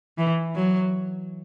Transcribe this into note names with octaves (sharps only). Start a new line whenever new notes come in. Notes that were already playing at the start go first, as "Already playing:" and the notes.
E3
F#3